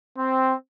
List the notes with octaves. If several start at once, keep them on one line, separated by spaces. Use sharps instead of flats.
C4